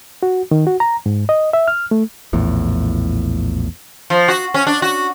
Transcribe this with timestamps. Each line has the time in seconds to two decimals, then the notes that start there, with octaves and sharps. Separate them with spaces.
0.23 F#4
0.51 D#3
0.67 F#4
0.80 A#5
1.06 G#2
1.29 D#5
1.53 E5
1.68 F6
1.91 A3
2.33 A#1 E2 A2
4.10 F3
4.28 F#4
4.54 C#4
4.67 D4
4.82 F#4